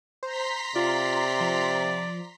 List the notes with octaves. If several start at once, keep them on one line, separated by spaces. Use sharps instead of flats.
C5 A#5 C6 B6
C3 F4 D5
F3